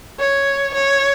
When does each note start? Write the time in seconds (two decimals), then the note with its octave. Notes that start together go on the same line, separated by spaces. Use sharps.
0.19 C#5
0.74 C#5